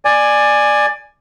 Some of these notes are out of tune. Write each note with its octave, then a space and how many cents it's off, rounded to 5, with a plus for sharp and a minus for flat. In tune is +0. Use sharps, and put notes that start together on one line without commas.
D5 +15 G#5 +0